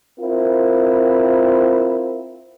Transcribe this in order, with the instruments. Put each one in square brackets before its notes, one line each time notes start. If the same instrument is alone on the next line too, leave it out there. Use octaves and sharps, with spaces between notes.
[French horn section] C4 E4 F4 A#4 C5